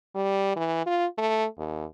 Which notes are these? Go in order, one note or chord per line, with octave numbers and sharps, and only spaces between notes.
G3
E3
F4
A3
D#2